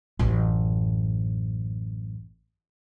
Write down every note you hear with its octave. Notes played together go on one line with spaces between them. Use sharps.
A1 F#2